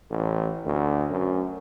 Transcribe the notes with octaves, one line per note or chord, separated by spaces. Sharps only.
A1
D2
F#2